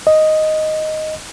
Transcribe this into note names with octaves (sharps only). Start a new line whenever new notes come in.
D#5